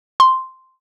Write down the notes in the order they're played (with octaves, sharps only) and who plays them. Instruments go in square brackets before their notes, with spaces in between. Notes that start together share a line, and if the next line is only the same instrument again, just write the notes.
[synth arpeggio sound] C6